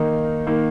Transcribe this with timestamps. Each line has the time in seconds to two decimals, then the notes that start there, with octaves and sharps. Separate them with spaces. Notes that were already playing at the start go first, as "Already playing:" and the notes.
Already playing: D#3 A#3 D#4
0.47 D#3 A#3